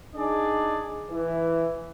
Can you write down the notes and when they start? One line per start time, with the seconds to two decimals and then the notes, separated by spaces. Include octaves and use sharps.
0.15 D4 D#4 G#4 D5
1.10 E3